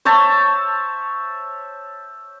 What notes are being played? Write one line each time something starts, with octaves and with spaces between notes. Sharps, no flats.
C5 C#5 E5 A5